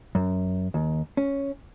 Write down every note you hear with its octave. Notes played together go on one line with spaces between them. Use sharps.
F#2
D#2
C#4